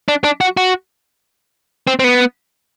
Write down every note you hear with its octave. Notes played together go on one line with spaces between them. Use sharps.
D4
D4
F#4
F#4
C4
C4
B3